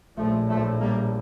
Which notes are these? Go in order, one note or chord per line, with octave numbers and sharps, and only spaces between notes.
A#1 A2 F3 A3
F3 A3
G3 A#3